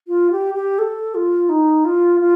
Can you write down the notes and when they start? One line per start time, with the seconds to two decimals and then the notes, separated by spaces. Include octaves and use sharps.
0.08 F4
0.31 G4
0.54 G4
0.79 A4
1.15 F4
1.49 D#4
1.85 F4
2.20 F4